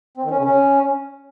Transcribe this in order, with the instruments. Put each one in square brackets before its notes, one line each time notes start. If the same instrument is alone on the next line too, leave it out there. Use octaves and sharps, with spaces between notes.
[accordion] C4
D#3
C#4
C#3
C#4